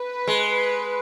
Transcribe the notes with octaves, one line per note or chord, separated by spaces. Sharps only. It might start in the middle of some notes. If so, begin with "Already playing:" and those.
Already playing: B4
G#3